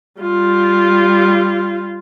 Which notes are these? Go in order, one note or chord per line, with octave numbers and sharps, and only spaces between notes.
G3 F4